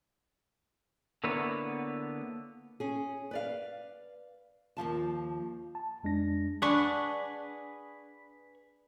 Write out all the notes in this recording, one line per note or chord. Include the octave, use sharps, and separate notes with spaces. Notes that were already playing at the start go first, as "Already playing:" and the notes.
D3 A#3 B3 E4 B4 C#5
C#4 G#4
B4 D5 F5
D#2 G#2 F3 A5
A5
F2 G#3 D4 A#6
D4 G#4 B4 F#5 C#6